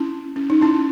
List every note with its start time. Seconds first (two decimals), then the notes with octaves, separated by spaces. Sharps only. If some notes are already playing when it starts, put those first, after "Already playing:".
Already playing: C#4 E4
0.36 C#4
0.50 D#4
0.61 C#4 E4